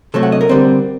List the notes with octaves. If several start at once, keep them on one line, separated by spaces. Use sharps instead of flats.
C3 F#3 A3 A4
F#5
D#5
A#4
D3 G3 C4